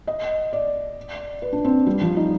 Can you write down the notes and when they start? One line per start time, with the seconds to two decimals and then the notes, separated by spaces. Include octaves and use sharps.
0.07 D#5
0.53 D5
1.42 B4
1.53 D4
1.65 C4
1.87 G3
2.01 F3
2.17 D#4